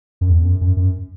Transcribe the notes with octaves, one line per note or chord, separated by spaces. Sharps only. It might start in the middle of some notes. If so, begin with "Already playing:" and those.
F#2
E2
F#2
F#2
F#2